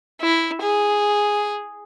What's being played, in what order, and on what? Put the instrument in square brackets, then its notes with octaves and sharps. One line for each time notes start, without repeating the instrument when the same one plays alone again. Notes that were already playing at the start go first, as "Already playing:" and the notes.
[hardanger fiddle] E4
G#4